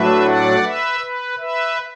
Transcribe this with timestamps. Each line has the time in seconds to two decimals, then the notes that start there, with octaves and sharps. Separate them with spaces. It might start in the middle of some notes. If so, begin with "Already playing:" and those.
Already playing: A2 F#3 A3 D4 B4 E5
0.25 D5 F#5
0.62 B4 E5
1.00 B4
1.38 B4 E5